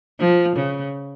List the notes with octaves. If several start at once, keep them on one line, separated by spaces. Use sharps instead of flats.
F3
C#3